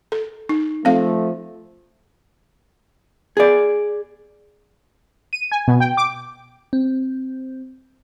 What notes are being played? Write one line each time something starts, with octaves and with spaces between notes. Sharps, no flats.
A4
D#4
F3 A3 C4 F5
G#4 D5
D#7
G#5
B2
G5
D6
C4